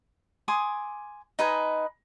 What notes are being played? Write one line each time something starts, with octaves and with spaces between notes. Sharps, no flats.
G#5 C6 D6 D#6
D#4 B4 D#5 G#5